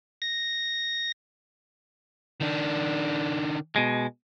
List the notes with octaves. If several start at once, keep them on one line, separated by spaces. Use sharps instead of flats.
A#6
D#3 D4
B2 G#3